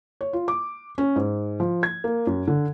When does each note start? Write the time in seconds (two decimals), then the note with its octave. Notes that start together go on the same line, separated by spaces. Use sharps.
0.21 C#5
0.33 F4
0.48 D6
0.98 C#4
1.16 G#2
1.60 F3
1.83 G#6
2.04 A#3
2.27 F#2
2.48 D3